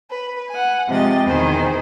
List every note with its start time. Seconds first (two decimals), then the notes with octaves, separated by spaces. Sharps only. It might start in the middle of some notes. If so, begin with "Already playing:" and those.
0.10 B4
0.51 F#5 G#5
0.89 C3 F3 G#3 D#5 G5 A6
1.25 E2 B2 D#3 G#4 C5